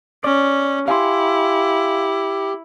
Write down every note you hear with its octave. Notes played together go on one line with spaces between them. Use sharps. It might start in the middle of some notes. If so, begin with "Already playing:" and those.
C#4 D5
E4 G4 F5 G#5 C6